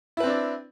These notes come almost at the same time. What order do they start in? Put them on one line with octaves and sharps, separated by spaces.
E4 B4 C4 D4 D5